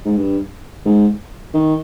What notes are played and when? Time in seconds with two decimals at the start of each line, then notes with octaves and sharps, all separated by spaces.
0.05 G#2
0.17 G2
0.86 G#2
1.54 D#3